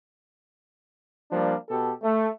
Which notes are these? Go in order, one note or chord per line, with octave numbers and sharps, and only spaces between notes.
F3 G3 A#3 D4
B2 G4 A4
A3